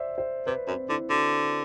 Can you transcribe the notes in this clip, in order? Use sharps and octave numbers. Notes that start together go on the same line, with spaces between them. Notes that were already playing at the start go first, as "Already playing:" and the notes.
Already playing: C5 D5 E5
C5
C3 B4
F#2 C4
D3 E4
D3 F#4